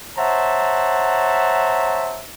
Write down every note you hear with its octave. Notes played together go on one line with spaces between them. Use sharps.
C5 C#5 E5 F#5 A5 A#5